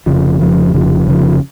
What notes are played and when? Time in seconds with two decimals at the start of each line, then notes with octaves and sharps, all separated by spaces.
0.06 F1 F2 C#3 F3
0.40 F1 F2 C#3 F3
0.73 F1 F2 C#3 F3
1.06 F1 F2 C#3 F3